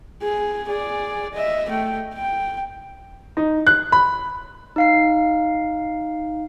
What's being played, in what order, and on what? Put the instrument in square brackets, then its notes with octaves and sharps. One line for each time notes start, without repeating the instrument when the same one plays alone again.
[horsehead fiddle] G#4
G#4 D5
D#5 E5
A3 G5
G5
[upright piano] D#4
F#6
B5
[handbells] D#4 F5 C7